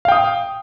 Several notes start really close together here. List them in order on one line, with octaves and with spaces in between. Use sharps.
F5 G5 D#6